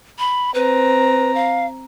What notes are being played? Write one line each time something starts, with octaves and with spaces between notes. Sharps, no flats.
B5
C4 B4 A#5
F5